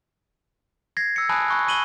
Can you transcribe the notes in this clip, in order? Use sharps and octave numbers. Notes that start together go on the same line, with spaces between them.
G#6 A#6 C7
E6 C#7
G#5 A5 B5 D#6 F#6
B5 C#6 F#6
B5 C#6 D#7 F#7 G7